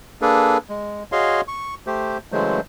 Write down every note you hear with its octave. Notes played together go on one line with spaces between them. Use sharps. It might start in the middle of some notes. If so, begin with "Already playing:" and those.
A#3 D4 G#4 A4 B4
G#3
F#4 G#4 C#5 D#5 F5 C6
C#6
A3 G4 C5
C#3 E3 F#3 G#3 A3 C5